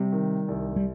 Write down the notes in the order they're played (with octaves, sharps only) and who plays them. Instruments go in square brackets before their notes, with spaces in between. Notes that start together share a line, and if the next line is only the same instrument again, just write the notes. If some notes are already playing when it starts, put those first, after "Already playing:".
Already playing: [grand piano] C3 [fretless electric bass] G3
[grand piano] D#3
C2
[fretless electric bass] G3